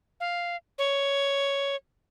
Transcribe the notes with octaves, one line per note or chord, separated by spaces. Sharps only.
F5
C#5